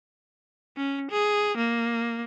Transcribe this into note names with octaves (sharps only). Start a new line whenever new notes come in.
C#4
G#4
A#3